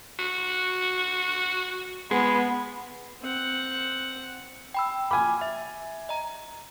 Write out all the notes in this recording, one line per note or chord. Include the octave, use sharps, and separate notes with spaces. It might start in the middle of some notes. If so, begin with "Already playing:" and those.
F#4
G#3 B3
C4 F#5
G5 B5 E6
G#5 B5 D6 F6
E5
D#5 A#5